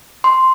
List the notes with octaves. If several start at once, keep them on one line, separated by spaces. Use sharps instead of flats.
C6